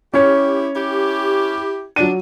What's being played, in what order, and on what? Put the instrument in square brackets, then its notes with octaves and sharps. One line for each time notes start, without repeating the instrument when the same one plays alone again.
[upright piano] C#4 C#5 [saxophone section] E4 G4
[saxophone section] E4 G4
[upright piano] F#3 D#7 [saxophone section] D4